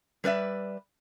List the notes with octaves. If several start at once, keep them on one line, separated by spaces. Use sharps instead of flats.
G3 B4 D5 E5